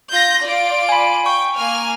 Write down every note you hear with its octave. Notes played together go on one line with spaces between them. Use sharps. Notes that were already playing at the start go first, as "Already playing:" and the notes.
F4 G6 A#6
F4 D5 D7
G#5 B5
G5 C#6
A#3 G#5 F6